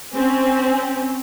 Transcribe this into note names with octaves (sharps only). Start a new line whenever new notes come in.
C4 C#4